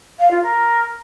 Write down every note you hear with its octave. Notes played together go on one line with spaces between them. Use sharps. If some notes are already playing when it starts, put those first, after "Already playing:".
F5
F4
A#4